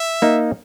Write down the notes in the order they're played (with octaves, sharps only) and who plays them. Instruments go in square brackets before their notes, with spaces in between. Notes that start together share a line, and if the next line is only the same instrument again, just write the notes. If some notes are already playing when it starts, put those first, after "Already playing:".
Already playing: [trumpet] E5
[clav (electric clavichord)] A#3 D#4